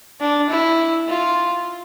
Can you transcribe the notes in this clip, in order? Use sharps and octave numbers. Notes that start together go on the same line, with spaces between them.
D4
E4
F4